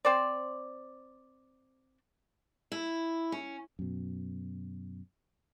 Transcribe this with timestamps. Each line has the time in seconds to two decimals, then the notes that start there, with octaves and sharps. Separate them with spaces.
0.05 C4 C5 D5
2.72 E4
3.32 C#4
3.79 F#2 B2